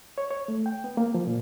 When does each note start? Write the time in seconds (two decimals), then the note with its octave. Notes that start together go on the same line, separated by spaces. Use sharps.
0.18 C#5
0.31 C#5
0.48 A3
0.66 G5
0.84 B3
0.97 A#3
1.14 F3
1.27 A#2